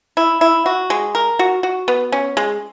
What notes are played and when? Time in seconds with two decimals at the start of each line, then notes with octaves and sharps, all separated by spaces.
0.17 E4
0.41 E4
0.66 F#4
0.90 G#3
1.15 A#4
1.39 F#4
1.63 F#4
1.88 B3
2.12 C#4
2.37 G#3